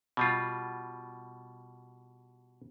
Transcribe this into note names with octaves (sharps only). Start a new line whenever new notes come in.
B2 G3 F4